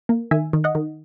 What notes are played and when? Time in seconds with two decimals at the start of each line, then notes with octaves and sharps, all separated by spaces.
0.09 A#3
0.31 D#3 E5 G#5
0.53 D#3
0.64 D#5 F#5
0.75 D#3